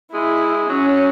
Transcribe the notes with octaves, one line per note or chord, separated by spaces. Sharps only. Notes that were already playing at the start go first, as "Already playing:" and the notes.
G#3 E4
F#3 C#4